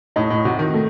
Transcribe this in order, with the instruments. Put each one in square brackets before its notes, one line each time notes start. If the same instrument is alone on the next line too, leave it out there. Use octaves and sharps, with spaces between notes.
[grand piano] A2 [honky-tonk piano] D#4
[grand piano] A2
[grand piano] C3 [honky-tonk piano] F#4
[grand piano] D#3
[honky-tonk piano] A3